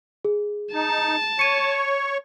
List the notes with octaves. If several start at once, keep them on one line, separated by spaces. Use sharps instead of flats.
G#4
D#4 A5
C#5 C#6 C#7 D#7